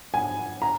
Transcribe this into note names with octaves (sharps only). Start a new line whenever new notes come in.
G#5
A#5